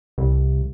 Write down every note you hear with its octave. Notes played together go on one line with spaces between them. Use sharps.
C2